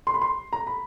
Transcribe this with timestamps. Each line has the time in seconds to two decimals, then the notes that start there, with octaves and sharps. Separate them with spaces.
0.07 C6
0.14 B5
0.22 C6
0.53 A#5
0.67 B5